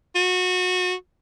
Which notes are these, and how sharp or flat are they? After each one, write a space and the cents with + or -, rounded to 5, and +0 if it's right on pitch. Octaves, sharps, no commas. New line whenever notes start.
F#4 -25